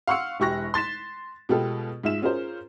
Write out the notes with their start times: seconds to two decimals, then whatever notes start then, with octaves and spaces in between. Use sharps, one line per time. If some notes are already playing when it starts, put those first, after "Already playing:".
0.07 F5 F#5 C6 C#6 E6 C#7
0.40 E1 E4 G4 C#6 F#6 A#6
0.74 C6 A6 B6 E7
1.49 B2 G#3 B3 F4 G4 A4
2.04 G#2 F4 E5 E7
2.22 C#4 F4 G#4 A#4 C5